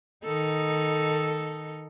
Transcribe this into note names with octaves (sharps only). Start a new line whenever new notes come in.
D#3 D#4 A4